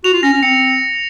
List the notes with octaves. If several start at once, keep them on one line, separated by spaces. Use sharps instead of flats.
F#4 F7
F4
C#4 A#6
C#4
C4 C#7